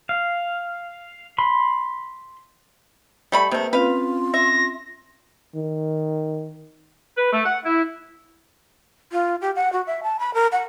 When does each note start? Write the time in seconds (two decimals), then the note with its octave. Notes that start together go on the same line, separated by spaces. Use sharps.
0.09 F5
1.38 B5 C6
3.32 G3 A3 B5
3.51 C3 A3 A#3 B4
3.73 C4 C#4 F4 B4 F5
4.34 E5 A#6
5.56 D#3
7.17 B4
7.31 A3
7.45 F#5
7.64 E4
9.12 F4
9.42 G4
9.56 F#5
9.73 F#4
9.87 E5
10.03 A5
10.19 B5
10.34 A#4
10.52 F#5